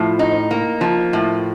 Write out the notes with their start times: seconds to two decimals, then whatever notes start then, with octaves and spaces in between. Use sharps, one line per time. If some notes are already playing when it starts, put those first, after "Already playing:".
Already playing: A2 F3
0.19 D#4
0.51 A#3
0.81 F3
1.13 A2